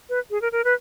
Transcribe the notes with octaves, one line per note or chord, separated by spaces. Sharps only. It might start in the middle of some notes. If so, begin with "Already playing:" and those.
B4
G#4
A#4
A#4
B4